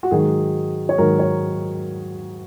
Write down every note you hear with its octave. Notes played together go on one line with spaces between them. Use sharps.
F#4
G#2 D#3 F#3 G#4
C#5
G#2 D#3 F#3 A#4
C#5